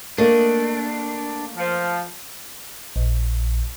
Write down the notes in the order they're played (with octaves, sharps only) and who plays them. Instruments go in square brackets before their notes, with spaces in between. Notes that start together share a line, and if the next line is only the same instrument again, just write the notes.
[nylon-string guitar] A3 D#5 [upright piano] A#3 [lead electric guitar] D4
[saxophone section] F3
[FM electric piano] A#1